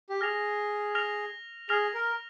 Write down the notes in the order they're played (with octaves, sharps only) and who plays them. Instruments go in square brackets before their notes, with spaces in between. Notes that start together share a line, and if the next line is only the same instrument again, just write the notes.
[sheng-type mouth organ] G4
[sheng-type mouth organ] G#4 [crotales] F6 A#6 F7
[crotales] F6 A#6 F7
[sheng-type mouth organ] G#4 [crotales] F6 A#6 F7
[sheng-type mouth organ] A#4